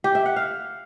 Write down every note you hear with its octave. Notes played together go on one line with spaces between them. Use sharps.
G4
E5
F#5
F5